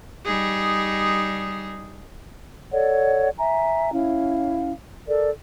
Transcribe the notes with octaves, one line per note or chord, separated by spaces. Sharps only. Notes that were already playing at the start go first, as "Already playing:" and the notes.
G3 D#4 G#4
A4 C#5 D5 F#5
E5 G#5 A#5
C#4 E4 F5
A4 A#4 D5